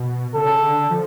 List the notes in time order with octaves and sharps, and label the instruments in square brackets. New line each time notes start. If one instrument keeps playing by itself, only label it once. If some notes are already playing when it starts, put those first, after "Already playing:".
Already playing: [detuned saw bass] B2
[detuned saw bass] C#3 [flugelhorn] A4
[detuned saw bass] D3
F3